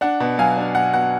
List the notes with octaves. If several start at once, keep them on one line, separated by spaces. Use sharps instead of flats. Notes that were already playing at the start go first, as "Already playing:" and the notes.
D4 F#5
B2
F#3 F5 G#5
D4
B2 F#5
B2 F#5